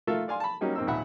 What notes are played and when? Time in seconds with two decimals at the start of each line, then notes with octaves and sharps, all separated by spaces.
0.07 A3 F4 A4 A#4 E5 F5
0.28 D5 F5 G#5 C6
0.40 A5 B5
0.61 F#3 G3 A#3 C#4 D#4
0.75 G#2 A#3 C4 D#4 E6
0.87 D#2 A#2 E5 F#5 B5